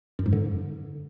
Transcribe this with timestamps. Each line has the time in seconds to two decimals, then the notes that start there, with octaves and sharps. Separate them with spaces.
0.19 F#2
0.26 G#2
0.33 D3